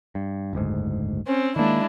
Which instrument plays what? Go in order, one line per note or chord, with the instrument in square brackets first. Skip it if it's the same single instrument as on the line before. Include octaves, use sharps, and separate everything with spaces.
[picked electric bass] G2
F#1 D2 G#2
[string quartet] C4 C#4
[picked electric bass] D#3 A#3 [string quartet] G#3 D4 E4